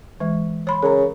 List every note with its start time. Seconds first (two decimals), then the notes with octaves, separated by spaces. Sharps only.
0.20 E3 G#3
0.67 C#5 B5 C6
0.82 C#3 A#4 A#5